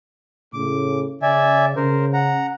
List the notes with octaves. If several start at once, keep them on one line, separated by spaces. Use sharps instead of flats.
A2 C#3 D6
C#3 D5 E5 G#5
C#3 A#4 C5
F#5 A#5